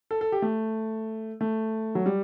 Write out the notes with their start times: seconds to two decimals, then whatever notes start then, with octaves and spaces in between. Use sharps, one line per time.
0.11 A4
0.21 A4
0.32 G4
0.42 A3
1.41 A3
1.95 F#3
2.06 G3